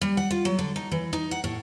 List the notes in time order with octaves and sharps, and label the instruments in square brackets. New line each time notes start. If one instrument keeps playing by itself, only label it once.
[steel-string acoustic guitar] G3
F#5
F4
F#3
D3
D#4
E3
D#4
F#5
A2